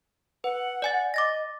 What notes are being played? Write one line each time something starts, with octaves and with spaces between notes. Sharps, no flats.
B4 F#5
D5 G#5 A6
D#5 D6 A6 A#6